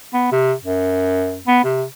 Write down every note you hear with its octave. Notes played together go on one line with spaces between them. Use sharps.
B3
C3
F#2
B3
C3